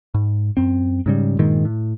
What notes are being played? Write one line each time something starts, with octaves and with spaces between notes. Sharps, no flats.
G#2
F#2 C4
G#2 C#3 G3
G2 A#2 D#3 G#3
A2